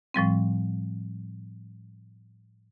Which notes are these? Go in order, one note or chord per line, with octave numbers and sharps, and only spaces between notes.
A2 F3 G3 C4